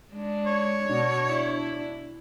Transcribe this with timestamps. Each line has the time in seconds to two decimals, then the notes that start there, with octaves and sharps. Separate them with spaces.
0.12 G#3 D4
0.46 C#5
0.89 B2 D4
1.26 E4